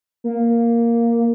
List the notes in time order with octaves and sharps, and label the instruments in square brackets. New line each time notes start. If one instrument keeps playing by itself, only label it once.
[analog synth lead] A#3